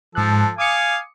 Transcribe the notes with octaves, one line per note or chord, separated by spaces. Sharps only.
G#2 F3 A4 F#6
F5 G#5 D6 D#6 C#7